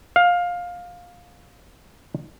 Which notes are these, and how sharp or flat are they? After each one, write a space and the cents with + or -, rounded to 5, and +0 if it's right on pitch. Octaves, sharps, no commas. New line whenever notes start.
F5 +15